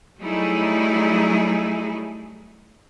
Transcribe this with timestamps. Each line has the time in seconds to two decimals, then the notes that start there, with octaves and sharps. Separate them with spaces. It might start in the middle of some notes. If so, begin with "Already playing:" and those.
0.20 F#3 G3 A3 D#4 E4 G#4